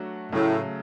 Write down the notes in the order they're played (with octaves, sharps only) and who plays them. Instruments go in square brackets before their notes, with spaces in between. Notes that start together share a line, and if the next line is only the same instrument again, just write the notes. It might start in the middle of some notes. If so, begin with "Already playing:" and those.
Already playing: [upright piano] F#3 A3 D4 F#4
[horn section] A2 [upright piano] C#3 F#3 A3